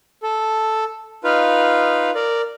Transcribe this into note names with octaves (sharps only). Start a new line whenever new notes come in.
A4
D#4 F4 B4 F5
A#4 D5